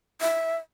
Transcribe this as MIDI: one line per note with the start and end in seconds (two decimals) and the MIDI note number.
0.21 0.56 76